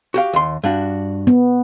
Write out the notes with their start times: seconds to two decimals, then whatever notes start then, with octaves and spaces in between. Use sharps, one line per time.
0.14 F#4 G4 F5
0.33 D#2 C6
0.64 G2 D4 F#4
1.27 B3